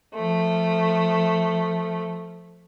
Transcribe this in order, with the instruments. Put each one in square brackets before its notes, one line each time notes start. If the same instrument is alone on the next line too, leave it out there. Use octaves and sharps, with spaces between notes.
[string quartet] F3 A3